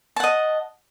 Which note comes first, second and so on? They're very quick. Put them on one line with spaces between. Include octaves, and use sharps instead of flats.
A5 F#5 D#5